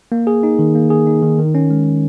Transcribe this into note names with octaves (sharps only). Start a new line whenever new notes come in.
A#3
G#4
D#4
D#3
A#3
G#4
D#4
D#3
D#3
C#4
G#3